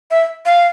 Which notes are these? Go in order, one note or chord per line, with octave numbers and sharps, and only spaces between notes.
E5
F5